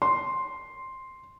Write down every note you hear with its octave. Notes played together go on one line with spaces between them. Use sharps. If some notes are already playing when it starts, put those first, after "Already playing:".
C6